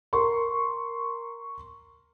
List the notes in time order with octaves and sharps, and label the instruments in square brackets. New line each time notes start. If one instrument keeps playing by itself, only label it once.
[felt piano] A#4 C6 C#6